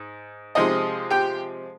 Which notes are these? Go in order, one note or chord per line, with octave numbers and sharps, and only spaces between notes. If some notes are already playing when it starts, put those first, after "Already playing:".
Already playing: G#2
C3 F3 G#3 C4 D#4 D#5
G4 G5